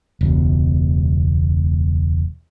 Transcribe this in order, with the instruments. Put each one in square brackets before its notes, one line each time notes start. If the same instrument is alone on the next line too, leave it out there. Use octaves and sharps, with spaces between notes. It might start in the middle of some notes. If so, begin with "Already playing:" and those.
[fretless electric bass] E1 C#2 B2